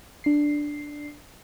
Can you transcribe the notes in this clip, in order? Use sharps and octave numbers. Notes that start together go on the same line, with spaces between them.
D4 C7